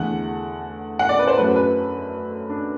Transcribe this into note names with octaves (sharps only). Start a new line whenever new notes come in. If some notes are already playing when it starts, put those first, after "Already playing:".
Already playing: E2 D3 A3 F#5
F#5
D5
B4
C5
F#2 F#3 A3 B4
B4
D4